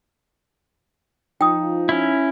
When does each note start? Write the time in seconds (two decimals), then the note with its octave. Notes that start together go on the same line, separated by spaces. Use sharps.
1.41 F3 D#4 G5 D#6
1.89 C#4 E4